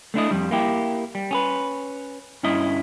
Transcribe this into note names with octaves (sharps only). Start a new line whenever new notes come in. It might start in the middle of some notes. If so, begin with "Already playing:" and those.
A3 D4 E4 D#5
F2 G3
A#3 E4 G4
G3
C#4 G#4 B4
G2 C#4 E4 D#5